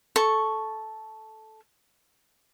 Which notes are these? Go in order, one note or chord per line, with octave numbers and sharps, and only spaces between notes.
A4 C#6